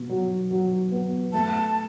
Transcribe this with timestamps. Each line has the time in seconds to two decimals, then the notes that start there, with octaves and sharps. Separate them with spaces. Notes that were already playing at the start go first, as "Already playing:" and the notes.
Already playing: B2
0.09 F#3
0.51 F#3
0.92 B3
1.33 A3 A5